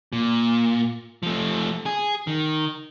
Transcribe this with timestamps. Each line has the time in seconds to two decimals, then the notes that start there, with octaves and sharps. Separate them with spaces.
0.13 A#2
1.23 F3 A3
1.86 G#4
2.27 D#3